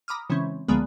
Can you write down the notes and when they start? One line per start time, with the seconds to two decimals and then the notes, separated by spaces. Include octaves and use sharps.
0.08 A#5 B5 D6 D#6 F6
0.30 C#3 E3 G#3 C4 C#4
0.68 C#2 D3 F3 G#3 A#3 B3